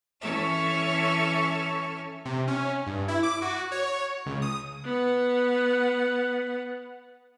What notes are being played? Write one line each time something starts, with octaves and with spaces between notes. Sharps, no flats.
E3 C#4 A4 C#5 E5 F6
C3
C#4
G2
E4
D6
F#4
C#5
C#2
D#6
B3 F#5